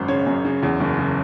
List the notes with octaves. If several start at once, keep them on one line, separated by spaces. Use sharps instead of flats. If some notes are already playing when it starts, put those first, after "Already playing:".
Already playing: G#1 F#2 C5
C#3 C#5
F#2
C#3
E2
F#1
C#3